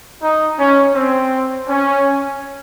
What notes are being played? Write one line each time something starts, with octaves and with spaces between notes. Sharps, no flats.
D#4
C#4
C4
C#4